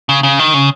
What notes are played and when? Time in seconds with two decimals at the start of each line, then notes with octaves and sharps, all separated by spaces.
0.09 C#3
0.23 C#3
0.39 D#3
0.54 C#3